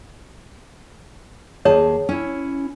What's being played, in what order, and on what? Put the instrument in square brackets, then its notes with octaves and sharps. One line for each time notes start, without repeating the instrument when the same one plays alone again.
[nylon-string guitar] D#2 G#4 A5 [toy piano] C#5
[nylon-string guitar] C#4 E4